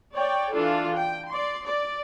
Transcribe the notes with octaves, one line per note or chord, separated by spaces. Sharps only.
C#5 D5 G5
E3 D4 F4 A4
G5
D5 C6
D5